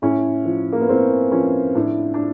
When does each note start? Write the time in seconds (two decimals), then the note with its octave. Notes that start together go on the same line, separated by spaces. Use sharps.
0.02 A2 C#4
0.45 F3
0.73 A#3
0.81 B3
0.89 A2 C4
1.32 F3 C#4
1.75 A2 D4
2.14 D4